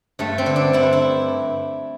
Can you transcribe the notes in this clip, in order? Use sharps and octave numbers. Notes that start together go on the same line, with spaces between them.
G2 A3
C4
D3
D4
G2 E4
E4